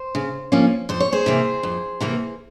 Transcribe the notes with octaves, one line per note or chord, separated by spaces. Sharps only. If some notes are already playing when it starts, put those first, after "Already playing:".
Already playing: C5
C#3
F3 A#3 C#4
F2 C5
C#5
G#4 C5
C3 E3 A#3
F2
C3 E3 A#3